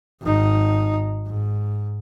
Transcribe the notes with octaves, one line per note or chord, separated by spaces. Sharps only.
G#1 D#4
G#2